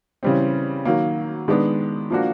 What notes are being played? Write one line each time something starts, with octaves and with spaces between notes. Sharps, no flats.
C#3 E3 G3 C4
D#3 F#3 A#3
D#3 G#3 B3 D4
F3 A#3 D4 F#4